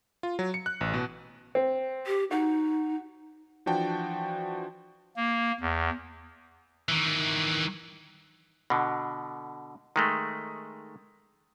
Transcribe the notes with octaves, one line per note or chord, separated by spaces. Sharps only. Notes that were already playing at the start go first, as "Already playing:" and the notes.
F4
F#3
C#7
F#6
A1
B2
C4
G4
D#4 F#4
E3 F3 D4 F#4 G5 A5
A#3
E2
D#3 E3
B2 D3
D#3 G#3 A3